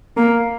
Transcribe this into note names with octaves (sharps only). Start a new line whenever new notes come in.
A#3